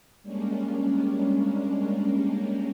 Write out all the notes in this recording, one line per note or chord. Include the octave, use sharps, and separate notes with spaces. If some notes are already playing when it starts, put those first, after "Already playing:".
G3 G#3 A#3 C#4 D4